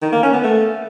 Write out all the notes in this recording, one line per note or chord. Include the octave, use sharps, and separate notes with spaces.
D#3
A#3
C#4
B3
A3